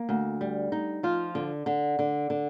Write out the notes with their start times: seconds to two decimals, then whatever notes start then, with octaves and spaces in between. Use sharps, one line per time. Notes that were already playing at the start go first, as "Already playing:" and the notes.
Already playing: A#3
0.09 D2
0.41 G3
0.72 D#4
1.03 F3 F4
1.35 D3
1.66 D3
1.99 D3
2.30 D3